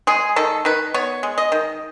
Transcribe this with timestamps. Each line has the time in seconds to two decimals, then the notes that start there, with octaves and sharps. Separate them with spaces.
0.07 G#3 G#4
0.36 D#3 A4
0.65 D#3 B4
0.94 B3 C#5
1.23 G#3
1.38 D#5
1.52 D#3